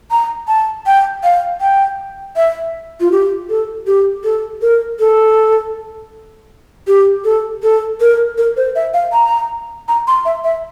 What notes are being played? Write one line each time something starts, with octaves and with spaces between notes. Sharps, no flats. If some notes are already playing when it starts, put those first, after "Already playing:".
A#5
A5
G5
F5
G5
E5
F4
G4
A4
G4
A4
A#4
A4
G4
A4
A4
A#4
A#4
C5
E5
F5
A#5
A#5
C6
E5
E5